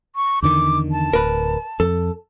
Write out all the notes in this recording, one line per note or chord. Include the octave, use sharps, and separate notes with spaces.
C#6
E2 D3 D#3 D6
A5
D1 A#4 B4
F2 A4